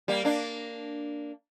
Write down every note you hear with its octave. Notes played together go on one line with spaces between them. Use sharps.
G3 A#3
A#3 D4